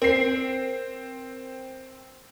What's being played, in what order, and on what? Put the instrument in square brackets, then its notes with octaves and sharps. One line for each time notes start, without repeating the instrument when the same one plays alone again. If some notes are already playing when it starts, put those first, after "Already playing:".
[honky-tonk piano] C4 C7 [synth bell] A#4